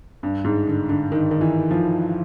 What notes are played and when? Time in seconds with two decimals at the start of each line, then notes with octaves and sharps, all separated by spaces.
0.23 G2
0.44 G#2
0.67 D3
0.89 D3
1.12 D#3
1.31 D#3
1.41 E3
1.71 F3